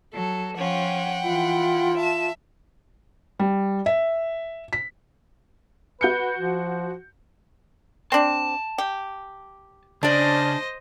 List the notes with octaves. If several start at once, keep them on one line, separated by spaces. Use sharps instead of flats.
F#3 A4
F3 C#4 F4 F#5 G5
E3 E4 F4
E5 A5 E7
G3
E5
B6
F#4 B4 G6 C#7
F3
C4 D4 A5
G4
C#3 D4 C5 D5 D#5